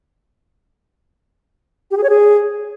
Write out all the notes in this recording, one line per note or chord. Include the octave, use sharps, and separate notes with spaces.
G4
G#4
C#5
G#4